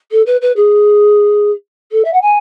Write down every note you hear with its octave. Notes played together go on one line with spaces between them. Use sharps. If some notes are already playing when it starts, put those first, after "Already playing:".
A4
B4
B4
G#4
A4
E5
F#5
G#5